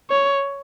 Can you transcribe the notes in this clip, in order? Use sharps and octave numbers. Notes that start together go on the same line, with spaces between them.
C#5